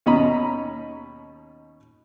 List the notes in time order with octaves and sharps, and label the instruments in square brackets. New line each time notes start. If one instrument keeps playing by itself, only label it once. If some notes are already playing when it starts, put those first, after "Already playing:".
[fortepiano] D#2 B2 C#4 D#5 A#5 B5